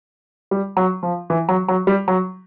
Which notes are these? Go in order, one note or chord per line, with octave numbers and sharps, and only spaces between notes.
G3
F#3
F3
E3
F#3
F#3
G3
F#3